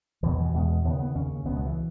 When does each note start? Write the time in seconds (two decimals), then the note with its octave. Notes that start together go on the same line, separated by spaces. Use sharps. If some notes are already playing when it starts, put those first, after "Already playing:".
0.23 E2 B2 E3
0.31 D#3
0.38 E3
0.54 E2 B2 G#3
0.84 D#2 C#3 B3
0.99 B3
1.15 D#2 C#3 C#4
1.46 C#2 B2 B3
1.56 G#3
1.66 E3